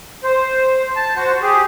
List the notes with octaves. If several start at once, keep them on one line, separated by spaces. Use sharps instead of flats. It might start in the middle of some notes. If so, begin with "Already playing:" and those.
C5
A5
F#4 C5
G4 G#4